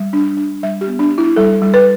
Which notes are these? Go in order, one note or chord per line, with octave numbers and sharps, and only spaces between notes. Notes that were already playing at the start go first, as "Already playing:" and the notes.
Already playing: G3
D4
D4
G3 E5
G4
B3
D4
D4
E4
G3 A4
G3
B4